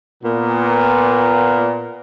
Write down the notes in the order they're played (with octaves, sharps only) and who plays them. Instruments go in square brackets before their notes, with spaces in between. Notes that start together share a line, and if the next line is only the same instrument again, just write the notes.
[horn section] A#2 B3